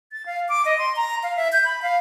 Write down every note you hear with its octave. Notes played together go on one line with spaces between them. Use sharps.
A6
F5
D6
D#5
C6
A#5
F5
E5
G6
B5
F5